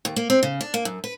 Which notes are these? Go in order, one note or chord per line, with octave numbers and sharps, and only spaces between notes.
D#2
A#3
C4
C#3
D4
A#3
F#2
B4